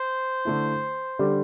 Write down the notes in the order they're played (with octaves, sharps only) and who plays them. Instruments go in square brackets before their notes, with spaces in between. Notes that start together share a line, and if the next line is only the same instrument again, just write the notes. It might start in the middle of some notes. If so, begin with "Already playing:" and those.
Already playing: [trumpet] C5
[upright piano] D3 A3 E4
D3 G3 D4 G4